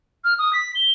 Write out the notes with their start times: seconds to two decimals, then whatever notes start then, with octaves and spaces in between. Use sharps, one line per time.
0.24 F6
0.39 D#6
0.53 B6
0.75 G7